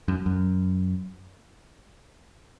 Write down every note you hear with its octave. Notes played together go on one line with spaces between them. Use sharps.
F#2
F#2